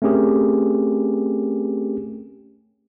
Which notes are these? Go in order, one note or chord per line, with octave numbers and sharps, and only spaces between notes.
A3 C4 C#4 G4 G#4 A#4